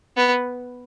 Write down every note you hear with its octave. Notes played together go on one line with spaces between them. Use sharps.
B3